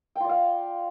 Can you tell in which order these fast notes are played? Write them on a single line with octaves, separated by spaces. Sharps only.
G5 F4 D5 F5